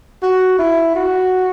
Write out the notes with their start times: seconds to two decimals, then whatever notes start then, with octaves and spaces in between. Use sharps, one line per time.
0.22 F#4
0.59 E4
0.95 F#4